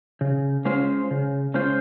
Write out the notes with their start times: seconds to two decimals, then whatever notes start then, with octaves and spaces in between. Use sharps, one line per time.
0.21 C#3
0.65 G#3 C#4 F4 C5
1.11 C#3
1.54 G#3 C#4 F4 C5